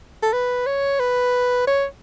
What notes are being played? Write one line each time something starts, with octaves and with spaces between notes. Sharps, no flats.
A4
B4
C#5
B4
C#5